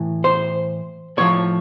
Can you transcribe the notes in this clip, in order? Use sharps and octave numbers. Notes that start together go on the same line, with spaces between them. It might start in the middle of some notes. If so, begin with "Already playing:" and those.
Already playing: A2 E3
C5
A2 F3 C#5